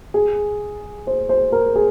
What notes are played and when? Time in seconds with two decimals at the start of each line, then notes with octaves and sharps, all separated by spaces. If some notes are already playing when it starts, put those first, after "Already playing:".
0.14 G#4
1.07 C5
1.29 C5
1.52 A#4
1.76 G#4